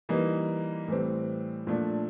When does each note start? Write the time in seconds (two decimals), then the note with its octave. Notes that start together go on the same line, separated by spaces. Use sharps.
0.09 E3 G3 A#3 D#4
0.88 A2 E3 G3 C4
1.67 A#2 F3 A3 D4